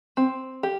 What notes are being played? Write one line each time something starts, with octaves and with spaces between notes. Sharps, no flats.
C4
G4